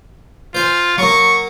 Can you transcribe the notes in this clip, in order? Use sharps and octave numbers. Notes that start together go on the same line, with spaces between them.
F4 C5 G#5
F#3 A#3 C#6